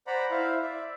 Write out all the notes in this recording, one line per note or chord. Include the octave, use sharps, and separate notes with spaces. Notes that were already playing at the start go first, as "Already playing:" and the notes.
C5 D5 F#5 A#5 B5
E4 C5 E5 F5
D5 E5